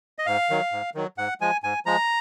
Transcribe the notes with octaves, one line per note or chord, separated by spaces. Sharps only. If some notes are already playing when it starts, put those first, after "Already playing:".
D#5
G#2 F5
D#3 F#3
G#2
D#3 F#3
G#2 F#5
F3 G#3 G#5
G#2 G#5
F3 G#3 A#5